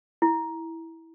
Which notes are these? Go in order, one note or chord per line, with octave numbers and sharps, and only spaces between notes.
E4